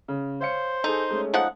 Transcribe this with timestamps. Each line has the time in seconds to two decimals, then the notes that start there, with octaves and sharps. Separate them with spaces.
0.08 C#3
0.41 C5 C#5 F5 C#7
0.84 D#4 G#4 A4
1.11 G#3 A3 C#4
1.34 F3 D#4 F#5